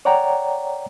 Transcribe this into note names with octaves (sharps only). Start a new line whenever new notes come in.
C#5 D5 F#5 G5 A#5